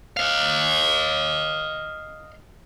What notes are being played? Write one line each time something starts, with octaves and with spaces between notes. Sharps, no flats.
D#5 F5